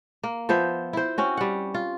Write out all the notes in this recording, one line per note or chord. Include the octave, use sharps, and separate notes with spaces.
A#3
F3 B3 C5 E5
E4 C5
C4 C#4 F#4
G3 F#5
F4